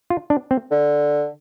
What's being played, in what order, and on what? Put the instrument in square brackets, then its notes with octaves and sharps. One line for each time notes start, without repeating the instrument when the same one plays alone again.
[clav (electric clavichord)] F4
D4
C4
[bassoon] D3